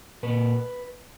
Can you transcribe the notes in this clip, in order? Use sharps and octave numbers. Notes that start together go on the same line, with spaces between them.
A#2 A#3 B4